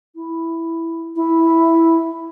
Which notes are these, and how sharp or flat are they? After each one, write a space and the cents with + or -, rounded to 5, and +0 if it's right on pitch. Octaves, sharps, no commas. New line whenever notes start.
E4 +0
E4 -5